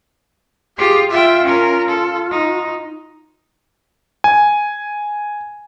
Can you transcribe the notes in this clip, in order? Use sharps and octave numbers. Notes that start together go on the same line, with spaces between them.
F4 G4 G#4
F4 E5 G5
C#4 A#4
A4
D#4
G#5